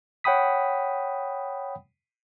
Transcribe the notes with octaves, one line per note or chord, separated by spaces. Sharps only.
C#5 F#5 G5 B5 D#6 B6